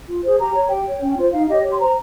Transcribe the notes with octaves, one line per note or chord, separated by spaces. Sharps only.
F4
G#4 C5
G4 A#5
C#5
G4 G5
C#5
C#4
F4 C5
D#4 F5
G4 C#5 D#5
G4 C#5
C6
C5 A#5